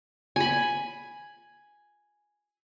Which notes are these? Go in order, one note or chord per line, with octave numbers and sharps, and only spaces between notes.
G#5 B5